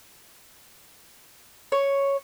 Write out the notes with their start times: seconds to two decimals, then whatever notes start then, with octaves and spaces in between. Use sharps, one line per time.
1.72 C#5